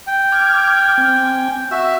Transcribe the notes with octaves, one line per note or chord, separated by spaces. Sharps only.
G5
D6 F6 G#6
C4 G#5
F#4 E5 E6